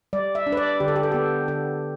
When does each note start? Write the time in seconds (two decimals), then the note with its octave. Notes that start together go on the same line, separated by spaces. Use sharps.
0.13 G3 D5
0.35 E5
0.47 D4
0.52 B4
0.57 D5
0.80 D3 G4
0.88 A4
0.96 G4
1.03 A4
1.12 B3 G4
1.48 D3 A4